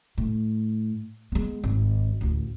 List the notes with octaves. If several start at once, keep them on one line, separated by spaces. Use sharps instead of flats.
A2
G#3 B3
G#1
A1 D2